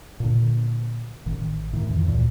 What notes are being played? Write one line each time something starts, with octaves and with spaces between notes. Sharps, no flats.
A#2 D3
A1 D#3
A2 D#3
F2 E3
D2 A#2